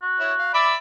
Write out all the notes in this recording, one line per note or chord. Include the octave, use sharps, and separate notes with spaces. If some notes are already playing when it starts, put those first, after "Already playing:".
F#4
E4 C#5
F5
D5 E5 B5 D6